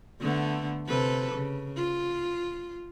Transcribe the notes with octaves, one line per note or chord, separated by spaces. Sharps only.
D3 A3 B3
C3 A4 B4
C#3
F4